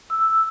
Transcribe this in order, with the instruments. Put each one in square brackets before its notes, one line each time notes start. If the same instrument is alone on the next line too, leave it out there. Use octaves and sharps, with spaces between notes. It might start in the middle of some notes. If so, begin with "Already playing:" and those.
[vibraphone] E6